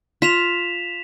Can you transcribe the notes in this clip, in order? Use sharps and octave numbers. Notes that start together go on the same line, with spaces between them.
F4 B6 E7 F7